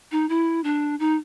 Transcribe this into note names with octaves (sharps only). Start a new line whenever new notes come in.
D#4
E4
D4
D#4